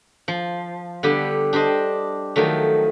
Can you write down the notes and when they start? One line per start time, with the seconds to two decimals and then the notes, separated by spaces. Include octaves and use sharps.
0.28 F3
1.03 D3 G3 B3 G4
1.53 D4 G4 C5 D#5
2.36 D#3 F3 F#3 A3